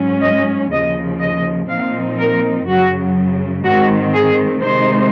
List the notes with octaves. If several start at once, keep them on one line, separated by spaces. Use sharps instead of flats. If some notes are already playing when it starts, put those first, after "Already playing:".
Already playing: G#2 F#3 C#4
D#5
D#2 C#3 F3 D#5
D#5
A#2 F3 C4 D#4 F5
A#4
F#2 C#3 F#3 F#4
G#2 D#3 G#3 C4 F#4
G#4
C3 D#3 G#3 D#4 C5